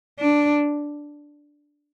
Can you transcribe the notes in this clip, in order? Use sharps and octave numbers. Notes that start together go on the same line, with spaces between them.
D4